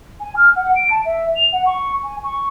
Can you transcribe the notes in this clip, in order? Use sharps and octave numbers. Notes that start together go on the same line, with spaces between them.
G#5
F6
F#5
D7
A5
E5
F7
F#5
C#6
G#5
C#6